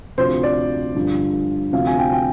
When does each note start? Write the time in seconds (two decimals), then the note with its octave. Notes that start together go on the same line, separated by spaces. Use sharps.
0.18 D2 C3 F3 C5
0.43 D5
0.95 G2 D3 F3
1.73 D2 C3 F3 F5
1.87 G#5
1.99 G5
2.13 G5